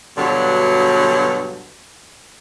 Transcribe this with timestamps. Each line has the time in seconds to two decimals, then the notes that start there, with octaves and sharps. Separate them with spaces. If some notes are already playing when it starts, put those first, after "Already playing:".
0.17 G2 B2 D3 F#3